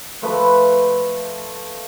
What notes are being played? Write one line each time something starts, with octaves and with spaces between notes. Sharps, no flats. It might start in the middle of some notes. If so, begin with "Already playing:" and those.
F3 A3 B4